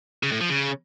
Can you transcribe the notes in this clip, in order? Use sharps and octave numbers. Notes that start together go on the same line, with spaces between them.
C#3
A2
F3
C#3